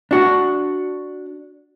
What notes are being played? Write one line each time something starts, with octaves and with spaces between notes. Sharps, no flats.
D4 F#4